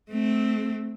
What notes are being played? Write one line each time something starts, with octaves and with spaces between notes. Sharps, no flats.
A3 C4